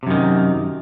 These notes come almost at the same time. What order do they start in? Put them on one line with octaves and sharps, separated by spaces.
C3 F#2 D#3